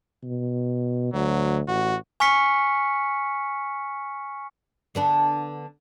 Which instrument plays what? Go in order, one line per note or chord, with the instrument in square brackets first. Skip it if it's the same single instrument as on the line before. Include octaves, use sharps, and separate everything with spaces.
[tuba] B2
[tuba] D2 [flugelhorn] F#3
[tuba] A1 [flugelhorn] F#4
[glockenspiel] G#5 C#6 F6 B6 C#7
[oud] D3 B3 D4